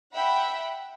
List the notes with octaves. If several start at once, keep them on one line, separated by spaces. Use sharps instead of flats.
E5 F#5 G5 B5